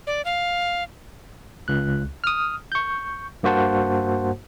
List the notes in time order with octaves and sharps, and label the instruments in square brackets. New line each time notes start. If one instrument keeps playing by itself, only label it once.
[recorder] D5
F5
[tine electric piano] C#2 F#6
D#6 F6
C#6 G6
G2 A#3 F#4 C5 F#5 A5